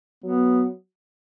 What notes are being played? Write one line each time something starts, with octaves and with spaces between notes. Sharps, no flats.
F#3 B3